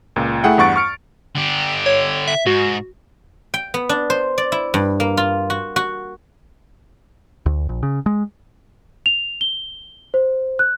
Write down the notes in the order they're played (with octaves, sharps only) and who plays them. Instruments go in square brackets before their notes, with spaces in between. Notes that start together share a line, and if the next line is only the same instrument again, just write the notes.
[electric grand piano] C#2 A#2
A3 E4 G#4 F#5 G5
E2 G2 F#5 C#6 A6 D7
C#6 F6 C#7 D7
[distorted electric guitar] D3 G4
[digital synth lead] C#5
E5
[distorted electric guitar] G#2 [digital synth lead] F#4
[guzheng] G5
B3
D4
C5
D5
E4
G2
A#3
F4
F#4
F#4
[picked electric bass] D2
A#1
C#3
G#3
[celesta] F7
G7
C5
F#6